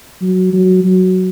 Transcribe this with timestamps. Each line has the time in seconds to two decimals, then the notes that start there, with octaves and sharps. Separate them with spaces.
0.22 F#3
0.53 F#3
0.84 F#3